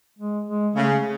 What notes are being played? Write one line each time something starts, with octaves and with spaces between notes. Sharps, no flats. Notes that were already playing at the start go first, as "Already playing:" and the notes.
G#3
G#3
C#3 A3